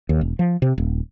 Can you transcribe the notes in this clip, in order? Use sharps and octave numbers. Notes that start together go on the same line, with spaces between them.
D#2
E1
F3
C3
D#1